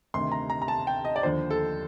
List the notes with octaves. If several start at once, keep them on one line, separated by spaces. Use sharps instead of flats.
D2 C3 D#3 C6
A#5
A#5
A#5
A5
G5
D#5
D5
D#2 D3 F3 C5
A4